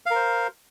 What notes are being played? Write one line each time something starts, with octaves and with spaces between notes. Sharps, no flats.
A#4 C5 F5